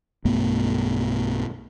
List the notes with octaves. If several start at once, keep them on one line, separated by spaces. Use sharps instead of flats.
B1 G2 A3 B3